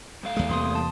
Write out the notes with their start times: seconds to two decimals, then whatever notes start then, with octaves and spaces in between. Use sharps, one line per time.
0.23 G2 A3 F5
0.37 D#2 G#3
0.49 E2 C3 A#3 C6 D#6
0.75 A5